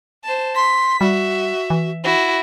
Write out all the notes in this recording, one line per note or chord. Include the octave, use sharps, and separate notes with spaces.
C5 A5
C6 B6
G3 F#4 E5
E3
E4 F#4